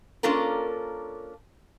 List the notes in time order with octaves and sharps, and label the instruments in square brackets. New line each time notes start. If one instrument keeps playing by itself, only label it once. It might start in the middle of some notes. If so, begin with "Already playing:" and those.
[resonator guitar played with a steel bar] A#3 C#4 D4 F4 A4 A#4